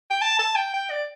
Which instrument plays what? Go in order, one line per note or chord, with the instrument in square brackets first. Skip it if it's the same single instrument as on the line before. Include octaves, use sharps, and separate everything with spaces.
[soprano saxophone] G5
A5
A5
G5
G5
D5